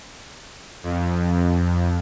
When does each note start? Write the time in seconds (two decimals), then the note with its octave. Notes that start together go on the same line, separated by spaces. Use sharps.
0.83 F2